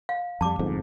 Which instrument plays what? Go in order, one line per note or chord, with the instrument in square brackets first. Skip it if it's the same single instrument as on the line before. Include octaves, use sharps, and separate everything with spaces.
[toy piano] F5
[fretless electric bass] F2 G3 [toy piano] A5 D6
[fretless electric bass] G1 F2 G#2